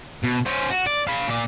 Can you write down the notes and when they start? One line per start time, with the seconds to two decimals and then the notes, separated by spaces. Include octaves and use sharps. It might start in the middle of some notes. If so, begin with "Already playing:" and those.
0.23 B2
0.46 C#4 C5
0.70 F#4
0.86 D5
1.07 F5 B5
1.28 A#2 D5